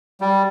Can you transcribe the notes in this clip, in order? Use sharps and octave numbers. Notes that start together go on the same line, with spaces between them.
G3